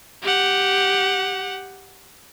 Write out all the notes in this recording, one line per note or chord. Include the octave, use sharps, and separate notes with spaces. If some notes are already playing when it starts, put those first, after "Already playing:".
G4 F#5